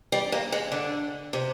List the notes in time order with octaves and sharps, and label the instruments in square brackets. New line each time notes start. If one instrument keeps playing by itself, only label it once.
[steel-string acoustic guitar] G3
A#3
G#3
D3
C3